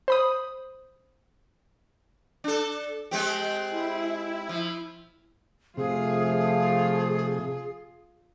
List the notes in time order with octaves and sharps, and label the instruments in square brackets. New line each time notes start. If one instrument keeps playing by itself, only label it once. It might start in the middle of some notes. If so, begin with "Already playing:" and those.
[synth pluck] C5 B5 D#6
[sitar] D4 A4
G#3 C4 G4
[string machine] E4
[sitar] F3
[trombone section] F2 F3 A3 [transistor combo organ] C3 [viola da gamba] F4 [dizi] G#4